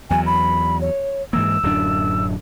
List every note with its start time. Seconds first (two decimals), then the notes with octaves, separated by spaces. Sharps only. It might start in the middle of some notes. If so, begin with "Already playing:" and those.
0.10 E2 F#3 G#5
0.26 B5
0.81 C#5
1.33 G#2 E3 A#3 E6
1.63 D1 F#2 D4